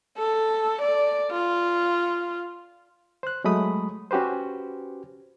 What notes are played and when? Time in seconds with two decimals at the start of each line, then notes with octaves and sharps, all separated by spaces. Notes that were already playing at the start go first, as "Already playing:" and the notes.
0.18 A4
0.82 D5
1.31 F4
3.23 C5 F#6
3.44 F#3 G#3 A3 B5 D#6
4.11 C#4 F#4 G4 B4 C5